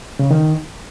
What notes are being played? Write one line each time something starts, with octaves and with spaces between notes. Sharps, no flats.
C#3
D#3